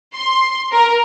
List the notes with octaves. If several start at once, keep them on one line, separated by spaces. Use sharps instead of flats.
C6
A#4